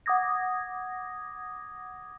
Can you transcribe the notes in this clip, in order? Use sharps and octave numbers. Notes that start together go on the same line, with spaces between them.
F#5 D6 D#6 G#6 A#6